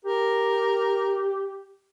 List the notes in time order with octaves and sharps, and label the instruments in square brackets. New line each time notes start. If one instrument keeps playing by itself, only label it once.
[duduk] G4 [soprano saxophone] A#4